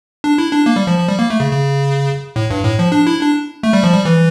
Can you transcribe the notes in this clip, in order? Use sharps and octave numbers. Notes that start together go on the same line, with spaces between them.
D4
E4
D4
A#3
G3
F3
F3
G3
A#3
A3
C#3
C#3
A2
G2
A2
F3
D4
E4
D4
A3
G3
F3
G3
E3